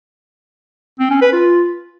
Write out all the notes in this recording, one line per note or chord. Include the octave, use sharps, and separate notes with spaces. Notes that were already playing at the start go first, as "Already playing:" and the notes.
C4
C#4
B4
F4